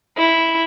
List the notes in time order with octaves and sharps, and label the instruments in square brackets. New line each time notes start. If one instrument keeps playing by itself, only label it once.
[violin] E4